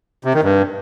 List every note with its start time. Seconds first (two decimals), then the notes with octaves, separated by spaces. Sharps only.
0.24 C3
0.34 D#3
0.43 G2